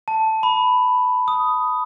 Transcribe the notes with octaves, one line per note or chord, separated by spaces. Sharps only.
A5
B5
D#6